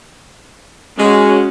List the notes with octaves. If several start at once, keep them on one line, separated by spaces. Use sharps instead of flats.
G#3 C#4 F#4